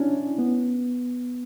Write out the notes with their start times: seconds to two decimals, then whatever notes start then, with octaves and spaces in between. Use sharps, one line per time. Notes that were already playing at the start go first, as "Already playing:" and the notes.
Already playing: C#4 D4 E4
0.38 B3